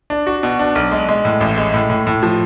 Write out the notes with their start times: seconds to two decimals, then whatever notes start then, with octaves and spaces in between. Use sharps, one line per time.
0.10 D4
0.27 F#4
0.43 B2
0.59 D4
0.75 B1
0.91 G#3
1.08 G#3
1.25 A2
1.41 A1
1.57 G#3
1.74 A2
1.90 A2
2.07 A2
2.23 F3